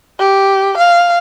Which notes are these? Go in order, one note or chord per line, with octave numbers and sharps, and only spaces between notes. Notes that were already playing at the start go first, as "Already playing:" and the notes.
G4
F5